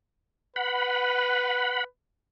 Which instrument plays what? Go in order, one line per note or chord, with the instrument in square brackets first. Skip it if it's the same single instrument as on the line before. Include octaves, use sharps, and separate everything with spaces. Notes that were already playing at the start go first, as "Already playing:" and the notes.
[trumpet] B4 [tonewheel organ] F#5 B5